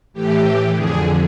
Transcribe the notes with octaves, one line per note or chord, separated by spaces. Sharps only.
A2 E3 G4
F2 D3 G#4